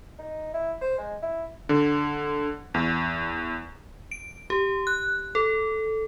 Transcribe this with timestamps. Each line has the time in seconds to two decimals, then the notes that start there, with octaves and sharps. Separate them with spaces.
0.19 D#4
0.54 E4
0.81 C5
0.98 G#3
1.23 E4
1.69 D3
2.74 E2
4.11 D7
4.50 G4
4.87 F#6
5.35 A4